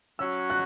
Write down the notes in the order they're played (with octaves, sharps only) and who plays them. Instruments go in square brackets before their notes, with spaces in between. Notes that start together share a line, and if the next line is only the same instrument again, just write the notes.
[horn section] F#3 C#4 F#4 [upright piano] E6
[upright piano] F#6